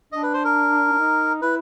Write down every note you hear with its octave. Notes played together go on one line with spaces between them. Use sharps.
D4 D#5
B4
C5
A#4
D4
D#4
E4 B4